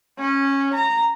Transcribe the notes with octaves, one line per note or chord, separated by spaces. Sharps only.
C#4
A#5